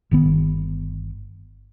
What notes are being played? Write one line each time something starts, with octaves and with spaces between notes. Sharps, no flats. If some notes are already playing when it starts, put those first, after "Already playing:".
G1 D#3 B3